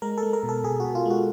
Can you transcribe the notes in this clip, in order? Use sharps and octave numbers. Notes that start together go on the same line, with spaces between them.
G#3 A#4
A4
G#3
A#4
B2
A4
B2 G#4
B2 F#4
F4
G#3 F#4